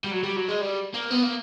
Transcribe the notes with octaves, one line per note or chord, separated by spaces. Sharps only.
G3
F#3
G3
F#3
G#3
G3
A#3
B3
A#3